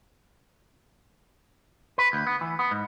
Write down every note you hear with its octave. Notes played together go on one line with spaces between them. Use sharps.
B4
D2
B3
E3
B3
G#2